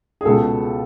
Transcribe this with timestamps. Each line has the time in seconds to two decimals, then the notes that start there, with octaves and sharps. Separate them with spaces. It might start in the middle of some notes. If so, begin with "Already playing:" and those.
0.21 G#4
0.25 C#2 B2 A4